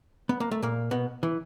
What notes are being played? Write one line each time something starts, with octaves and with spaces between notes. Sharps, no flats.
B3
A#3
A3
A#2 A#3
B2 B3
E3